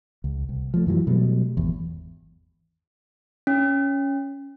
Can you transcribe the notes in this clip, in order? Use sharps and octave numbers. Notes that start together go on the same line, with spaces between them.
C#2
C2
F3 A3
F#2 E3 F#3
B2 F#3 G3 A3
G#1 E2
C#4